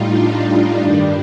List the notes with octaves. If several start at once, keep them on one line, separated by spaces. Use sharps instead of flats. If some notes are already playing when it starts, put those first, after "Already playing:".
Already playing: A2 G3 D#4 F4
D4
G2 D#3 G3